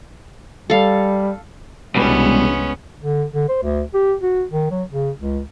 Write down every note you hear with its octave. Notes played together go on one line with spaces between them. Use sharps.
G3 A4 F5
E1 C2 B2 G3 G#3 B3 C#4
D3
D3
C5
D2
G4
F#4
D#3
F#3
C#3
C#2